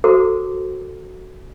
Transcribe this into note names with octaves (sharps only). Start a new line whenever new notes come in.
F#4 A4 A#4 C5 A#5 D6